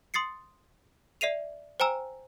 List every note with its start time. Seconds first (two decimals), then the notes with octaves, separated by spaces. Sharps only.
0.14 C6 D#6 A6 C7 C#7
1.21 D5 E5 C7 D#7 F7
1.80 C5 G5 G#5 A#5 E6